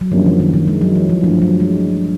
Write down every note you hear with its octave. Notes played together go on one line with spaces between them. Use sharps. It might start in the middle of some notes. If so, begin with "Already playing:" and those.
F#3
F#2 D3 F3 G3 A#3 C#4
E3
D#3
D#3
G#3
F#3
E3
F3
G2 E3 F3 A3
F#3
G#3